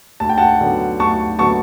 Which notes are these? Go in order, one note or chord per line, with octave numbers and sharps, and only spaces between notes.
D2 A5
G5
F#5 A5
D3 F#3 B3
D2 A5 C#6
D3 F#3 B3 A5 C#6